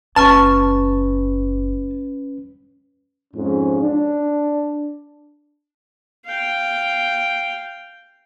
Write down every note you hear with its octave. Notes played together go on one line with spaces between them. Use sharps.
F#1 C#4 B4 A5 C#6 F6 A6
F2 G#2 F3 C#4
D4
F5 G5